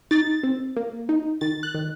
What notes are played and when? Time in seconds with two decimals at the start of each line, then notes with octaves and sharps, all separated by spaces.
0.11 D#4 A6
0.43 C4
0.76 A#3
1.09 D#4
1.41 D#3 A6
1.63 F#6
1.75 D#3